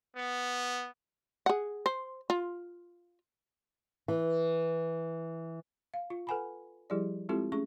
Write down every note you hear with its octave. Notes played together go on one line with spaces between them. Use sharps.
B3
G#4 F#5
C5
F4
E3
F5
F4
A4 B4 F#5 G#5 A#5 B5
F3 G3 E4 G4 G#4 D5
G#3 C4 E4 F4 G4 A4
A3 C#4 G#4 C#6